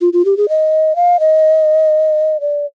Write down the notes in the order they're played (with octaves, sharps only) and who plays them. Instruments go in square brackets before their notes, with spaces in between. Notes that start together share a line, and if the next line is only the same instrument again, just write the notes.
[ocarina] F4
F4
G4
G#4
D#5
F5
D#5
D5